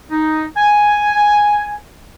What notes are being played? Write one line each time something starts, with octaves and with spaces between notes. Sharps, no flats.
D#4
G#5